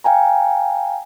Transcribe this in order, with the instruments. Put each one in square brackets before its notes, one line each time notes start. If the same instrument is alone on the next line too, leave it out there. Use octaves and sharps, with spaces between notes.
[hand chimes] F5 G5 G#5 A#5